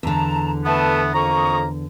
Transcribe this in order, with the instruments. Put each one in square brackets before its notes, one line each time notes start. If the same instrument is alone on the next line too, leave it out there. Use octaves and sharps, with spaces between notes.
[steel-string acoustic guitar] E2 D3 [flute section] A5 A#5
[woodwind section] A3 B3 [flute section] B4 A5
[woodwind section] F2 A#3 A#5 [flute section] C#6 D#6